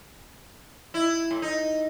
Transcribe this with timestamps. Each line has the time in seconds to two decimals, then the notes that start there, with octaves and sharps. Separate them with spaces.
0.94 E4
1.31 A2
1.42 D#4